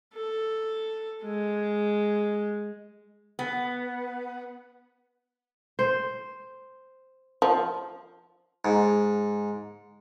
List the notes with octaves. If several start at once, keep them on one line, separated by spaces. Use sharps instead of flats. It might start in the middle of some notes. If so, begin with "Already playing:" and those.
A4
G#3
B3
C5
F3
G#2